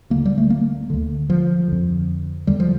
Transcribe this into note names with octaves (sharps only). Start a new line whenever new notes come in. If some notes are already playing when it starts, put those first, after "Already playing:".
D2 D3 A#3
G3
A3
A#3
D2 D3
F3
F2 D3
E2 D3 G3
F3